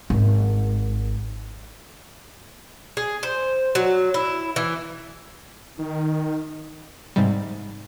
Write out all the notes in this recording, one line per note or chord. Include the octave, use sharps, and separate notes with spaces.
G#1
G#4
C5
F#3
E4
E3
D#3 D#4
G#2 C3 G3